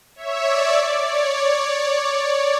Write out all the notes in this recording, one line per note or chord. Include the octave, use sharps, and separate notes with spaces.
C#5 E5
D5
D5
C#5